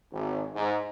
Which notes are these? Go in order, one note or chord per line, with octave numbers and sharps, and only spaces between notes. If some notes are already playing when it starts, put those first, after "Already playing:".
G#1
G#2